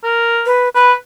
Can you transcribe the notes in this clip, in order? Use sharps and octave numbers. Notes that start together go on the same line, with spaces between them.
A#4
B4
B4 B5